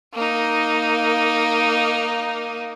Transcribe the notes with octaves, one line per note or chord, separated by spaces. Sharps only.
A#3 D#4